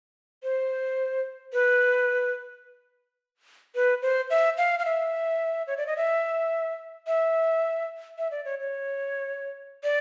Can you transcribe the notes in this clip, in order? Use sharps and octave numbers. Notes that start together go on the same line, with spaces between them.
C5
B4
B4
C5
E5
F5
F5
E5
C#5
D5
D#5
E5
E5
E5
D5
C#5
C#5
D5